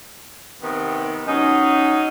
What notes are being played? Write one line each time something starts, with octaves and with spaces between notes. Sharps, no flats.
C3 D#3 B3
F#3 C#4 D#4